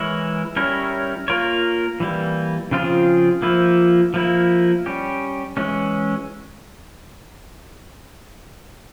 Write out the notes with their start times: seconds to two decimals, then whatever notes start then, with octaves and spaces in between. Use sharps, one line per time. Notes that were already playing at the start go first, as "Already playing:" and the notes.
Already playing: E3 G#3 E4 A#4 C#5
0.56 G3 C#4 E4 A#4 C#5
1.28 A#3 F4 A#4 C#5
2.00 E3 G3 A#3
2.71 C#3 F3 C4 F4 G#4
3.42 F3 A#3 E4
4.14 F3 A#3 E4
4.86 G3 C#4 G4
5.57 E3 G#3 C#4